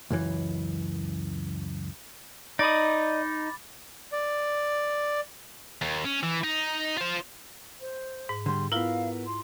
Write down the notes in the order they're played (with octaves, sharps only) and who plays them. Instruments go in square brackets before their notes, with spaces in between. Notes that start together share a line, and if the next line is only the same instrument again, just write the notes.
[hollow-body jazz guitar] C#2 F#2 E3
[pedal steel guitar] D#4 [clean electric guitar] D5 D#5 [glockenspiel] B5 D6 A6
[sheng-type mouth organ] D5
[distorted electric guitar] D#2
C#4
E3
D#4
F4 C5
[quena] C5
[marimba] G#2
[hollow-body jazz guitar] D3 G3 [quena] C6
[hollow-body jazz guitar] B3 A#4 [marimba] E4 F4 [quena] F5
[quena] C6